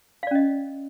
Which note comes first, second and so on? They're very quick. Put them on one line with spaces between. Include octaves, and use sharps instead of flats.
F5 D5 C#4 D#5